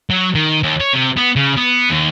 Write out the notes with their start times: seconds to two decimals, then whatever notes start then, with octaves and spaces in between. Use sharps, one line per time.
0.10 F#3
0.35 D#3
0.63 D#2
0.81 C#5
0.94 C3
1.17 B3
1.36 C#3
1.57 B3
1.90 D#2